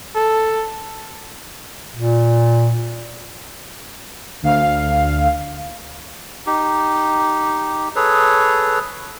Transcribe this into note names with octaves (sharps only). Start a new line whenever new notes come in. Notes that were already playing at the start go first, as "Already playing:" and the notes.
A4
A#2
D2 F5
D#4 G4
G#4 A4 B4 C#5